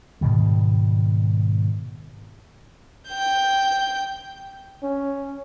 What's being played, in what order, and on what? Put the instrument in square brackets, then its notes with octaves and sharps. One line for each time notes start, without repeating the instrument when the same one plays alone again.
[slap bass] G#2 B2 D#3 G3
[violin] G5 G6
[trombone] C#4